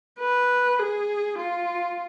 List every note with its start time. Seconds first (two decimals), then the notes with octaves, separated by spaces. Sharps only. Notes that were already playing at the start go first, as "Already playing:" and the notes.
0.20 B4
0.79 G#4
1.39 F4